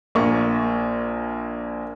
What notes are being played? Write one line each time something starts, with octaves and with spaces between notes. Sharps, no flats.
A#1 A#3 C#6